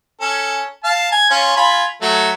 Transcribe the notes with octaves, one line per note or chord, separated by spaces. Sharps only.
C#4 A4
F5 A5
G#5
C#4 F4
F4 G#5 B5
F#3 A3